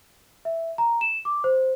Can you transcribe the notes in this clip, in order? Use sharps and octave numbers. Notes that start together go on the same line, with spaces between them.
E5
A#5
E7
D6
C5